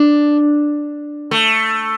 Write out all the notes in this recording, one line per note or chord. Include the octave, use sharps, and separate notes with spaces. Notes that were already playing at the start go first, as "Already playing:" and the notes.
Already playing: D4
A3